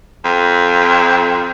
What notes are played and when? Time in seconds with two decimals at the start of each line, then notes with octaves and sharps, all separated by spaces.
0.25 F2